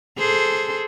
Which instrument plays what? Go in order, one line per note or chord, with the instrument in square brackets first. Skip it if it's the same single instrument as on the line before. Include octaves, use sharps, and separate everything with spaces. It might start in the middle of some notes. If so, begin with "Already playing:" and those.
[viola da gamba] G#4 A4 C5